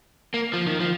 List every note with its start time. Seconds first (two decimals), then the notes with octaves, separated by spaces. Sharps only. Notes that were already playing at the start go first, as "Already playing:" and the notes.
0.34 A#3
0.53 F3
0.67 D#3
0.80 F3